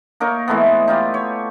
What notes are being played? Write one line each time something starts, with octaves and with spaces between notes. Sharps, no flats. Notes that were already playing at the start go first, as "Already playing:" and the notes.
A#3 D#4 A#4 C#5
E3 G#3 A3 B3
D#4 F4 G4
C#5